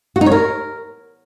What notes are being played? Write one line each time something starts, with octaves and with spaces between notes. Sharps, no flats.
F#4
D#4
C#5
A#4